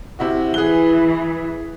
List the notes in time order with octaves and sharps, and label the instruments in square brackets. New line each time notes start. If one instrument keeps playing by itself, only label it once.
[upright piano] C3 E4 F#4
[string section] E3 [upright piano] G#4 F#6 G7